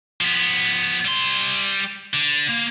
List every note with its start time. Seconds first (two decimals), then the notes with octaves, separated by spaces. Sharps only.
0.21 F3 B3
1.05 G3 C6
2.14 D3
2.49 A#3